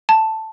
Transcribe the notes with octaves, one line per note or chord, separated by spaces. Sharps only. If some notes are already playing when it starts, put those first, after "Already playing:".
A5